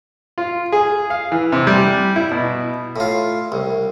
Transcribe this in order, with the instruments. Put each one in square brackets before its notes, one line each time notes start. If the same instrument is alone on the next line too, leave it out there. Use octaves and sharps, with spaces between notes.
[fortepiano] F4
G#4
F5
E3
C3
G3
E4
B2
[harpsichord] A2 F4
C2